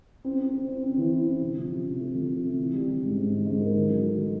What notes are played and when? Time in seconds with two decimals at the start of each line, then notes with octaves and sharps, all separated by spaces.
0.24 C4
0.39 C4
0.53 C4
0.68 C4
0.83 C4
0.98 E3
1.12 E4
1.26 C4
1.41 C3
1.56 F3
1.71 C3
1.85 C3
2.00 A3
2.14 F3
2.29 A3
2.44 C3
2.58 E3
2.73 G3
2.88 E3
3.02 G#2
3.17 G#2
3.31 E3
3.46 G#2
3.61 A#3
3.75 D#3
3.90 F#3
4.05 A3
4.19 F#3